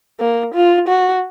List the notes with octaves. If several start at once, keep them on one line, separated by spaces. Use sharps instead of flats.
A#3
F4
F#4